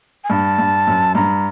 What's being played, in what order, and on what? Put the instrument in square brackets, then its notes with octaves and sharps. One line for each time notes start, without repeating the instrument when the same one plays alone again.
[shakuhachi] G#5
[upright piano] G2 [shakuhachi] A5
[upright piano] G2
F#2
[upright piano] G2 [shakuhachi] A#5